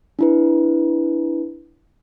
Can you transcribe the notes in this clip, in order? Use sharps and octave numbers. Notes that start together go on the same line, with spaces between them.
D4 E4 B4